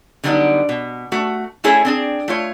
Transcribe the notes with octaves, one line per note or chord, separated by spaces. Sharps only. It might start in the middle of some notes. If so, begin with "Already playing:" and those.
D3 F#3 G3 B3 C#4 D#4
B2
A3 F#4
A3 C#4 E4 G#4 A4 C#5
C4 D4 G#4
A3 F4 C#5